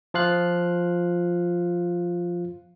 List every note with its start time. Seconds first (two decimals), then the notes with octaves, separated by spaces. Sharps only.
0.14 F3 F4 F5 F#6